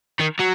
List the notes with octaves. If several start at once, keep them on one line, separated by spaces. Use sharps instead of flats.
D#3
F#3